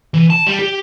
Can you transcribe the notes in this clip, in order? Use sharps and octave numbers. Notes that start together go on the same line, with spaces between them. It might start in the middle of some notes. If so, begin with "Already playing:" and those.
E3
A5
G3
G4